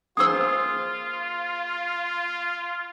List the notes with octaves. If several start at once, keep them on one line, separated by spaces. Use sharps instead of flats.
A#3 F4 G#4 C5 D#6 E6